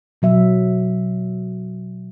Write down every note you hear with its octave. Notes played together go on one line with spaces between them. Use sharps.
B2 F#3 E5